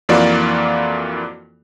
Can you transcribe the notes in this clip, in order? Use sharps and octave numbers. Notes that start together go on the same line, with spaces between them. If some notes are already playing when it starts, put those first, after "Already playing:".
F2 E3 A#3 F4 F#4 D5